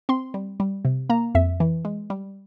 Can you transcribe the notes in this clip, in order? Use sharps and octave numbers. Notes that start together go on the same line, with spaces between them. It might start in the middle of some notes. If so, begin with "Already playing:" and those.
C4 C6
G3
G3
C3
A#3 A#5
F2 E5
E3
G#3
G3